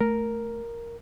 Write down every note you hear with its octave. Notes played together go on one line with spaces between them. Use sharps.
A3 A#4